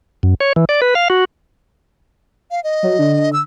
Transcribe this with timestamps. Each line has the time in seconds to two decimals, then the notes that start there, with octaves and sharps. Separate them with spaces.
0.23 F#2
0.41 C#5
0.56 E3
0.69 D5
0.82 B4
0.95 F5
1.10 F#4
2.51 F5
2.64 D#5
2.83 F#3
2.99 D3
3.33 E6